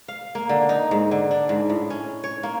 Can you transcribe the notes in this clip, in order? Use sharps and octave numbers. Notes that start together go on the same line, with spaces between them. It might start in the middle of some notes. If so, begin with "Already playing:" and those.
F5
A#3
D3
D#4
G#2
D3
D4
G#2
A2
C#4
C#5
A#3